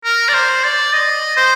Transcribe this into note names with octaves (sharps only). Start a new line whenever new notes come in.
A#4
D5
C5
D5
D#5
C5